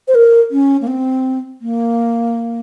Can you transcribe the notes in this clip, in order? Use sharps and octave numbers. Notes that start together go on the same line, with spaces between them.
C5
A#4
C#4
A#3
C4
A#3